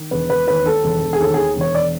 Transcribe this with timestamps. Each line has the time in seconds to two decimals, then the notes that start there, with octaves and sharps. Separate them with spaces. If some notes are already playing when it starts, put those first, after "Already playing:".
Already playing: D#3
0.11 E1 B4
0.29 E1 B4
0.47 D#2 B4
0.66 D#3 A4
0.84 E1
1.02 E1
1.13 G#4
1.21 D#2 A4
1.34 D#3 G#4
1.56 E1 C#5
1.75 D5